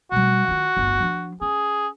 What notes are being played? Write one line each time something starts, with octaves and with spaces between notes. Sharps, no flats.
B2 G3 F#4
D#3 F4
D1 G1
F3 D4
C#4 G#4